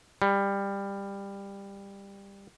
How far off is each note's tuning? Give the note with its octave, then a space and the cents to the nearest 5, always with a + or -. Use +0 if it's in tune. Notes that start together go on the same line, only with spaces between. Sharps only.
G3 +15